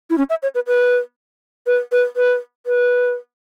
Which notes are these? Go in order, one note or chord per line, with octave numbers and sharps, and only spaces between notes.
E4
C#4
E5
C#5
B4
B4
B4
B4
B4
B4